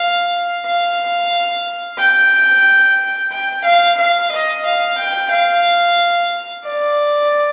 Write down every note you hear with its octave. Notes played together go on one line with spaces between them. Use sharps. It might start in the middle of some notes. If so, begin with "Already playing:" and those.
Already playing: F5
F5
G5
G5
F5
F5
D#5
F5
G5
F5
D5